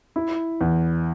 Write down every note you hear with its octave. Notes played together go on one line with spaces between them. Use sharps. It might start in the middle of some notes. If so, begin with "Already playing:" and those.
E4
E2